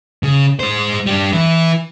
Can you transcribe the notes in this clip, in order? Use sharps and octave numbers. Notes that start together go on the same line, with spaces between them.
C#3
G#3 C5
G3 D4
E3 E4